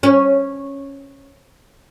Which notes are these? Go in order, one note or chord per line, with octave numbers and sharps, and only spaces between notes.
C#4